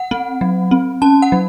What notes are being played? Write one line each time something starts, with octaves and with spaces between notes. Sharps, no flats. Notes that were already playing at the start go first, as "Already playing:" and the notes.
Already playing: F#5
C4
F#3
C4
C#4 A5
F#5
F#3